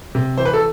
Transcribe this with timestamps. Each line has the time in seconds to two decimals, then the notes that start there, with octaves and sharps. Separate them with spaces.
0.15 C3
0.37 E3 C5
0.45 B4
0.53 A4